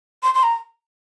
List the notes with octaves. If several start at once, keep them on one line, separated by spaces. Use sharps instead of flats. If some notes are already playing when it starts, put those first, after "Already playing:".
C6
C6
A#5